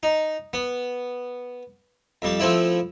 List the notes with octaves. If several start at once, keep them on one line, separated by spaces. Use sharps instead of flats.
D#4
B3
F2 G3 A5
F3 A3 C4 E4